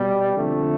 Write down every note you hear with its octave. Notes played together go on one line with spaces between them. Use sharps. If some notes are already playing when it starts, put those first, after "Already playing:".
Already playing: B2 G3
F2 D3 A3